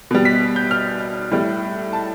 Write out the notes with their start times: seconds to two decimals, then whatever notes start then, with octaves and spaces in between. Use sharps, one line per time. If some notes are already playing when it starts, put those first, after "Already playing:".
0.11 B2 G3
0.25 B6
0.56 G6
0.71 F6
1.31 A2 G3
1.93 A5